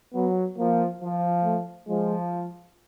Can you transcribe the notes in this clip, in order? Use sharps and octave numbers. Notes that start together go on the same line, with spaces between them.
F#3 B3
F3 A#3
F3
A3
F3 G#3